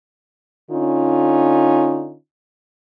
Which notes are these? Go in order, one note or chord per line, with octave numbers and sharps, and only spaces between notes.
D3 C#4 D#4 F4